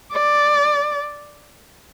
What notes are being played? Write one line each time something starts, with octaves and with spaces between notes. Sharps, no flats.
D5